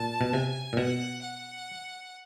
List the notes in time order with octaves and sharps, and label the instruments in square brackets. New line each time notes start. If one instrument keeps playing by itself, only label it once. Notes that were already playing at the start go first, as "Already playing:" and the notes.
Already playing: [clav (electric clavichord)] A#2 [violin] A5
[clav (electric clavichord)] B2
[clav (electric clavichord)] C3 [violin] G#5
[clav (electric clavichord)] A#2
[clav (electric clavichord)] B2 [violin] F#5
[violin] F#5